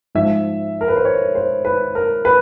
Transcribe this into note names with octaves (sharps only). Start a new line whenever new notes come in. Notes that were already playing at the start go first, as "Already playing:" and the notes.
G#2 F3 E5
A#4
B4
C5
C#5
C5
B4
A#4
B4